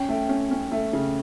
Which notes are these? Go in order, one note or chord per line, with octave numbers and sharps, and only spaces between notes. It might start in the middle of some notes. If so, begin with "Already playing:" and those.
Already playing: C#4 G5
A3
C#4
C#4
A3
C#3